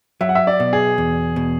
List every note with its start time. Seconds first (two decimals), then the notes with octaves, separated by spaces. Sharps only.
0.21 F#3 E5
0.29 F#5
0.35 E5
0.47 D5
0.60 B2
0.73 G#4
0.98 E2
1.36 B2